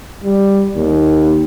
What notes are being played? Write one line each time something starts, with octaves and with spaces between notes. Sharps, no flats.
G3
D#2